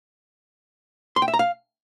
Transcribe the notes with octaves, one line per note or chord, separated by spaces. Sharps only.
C6
G5
E5
A#5
F5